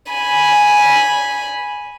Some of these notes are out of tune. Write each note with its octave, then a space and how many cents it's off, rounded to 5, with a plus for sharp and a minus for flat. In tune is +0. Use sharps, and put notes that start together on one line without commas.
G#5 +0 B5 -10